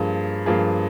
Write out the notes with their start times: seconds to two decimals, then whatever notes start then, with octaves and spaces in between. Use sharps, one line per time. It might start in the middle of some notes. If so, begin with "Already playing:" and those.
Already playing: G2 F3 A#3 F4 G#4
0.46 G2 F3 A#3 F4 G#4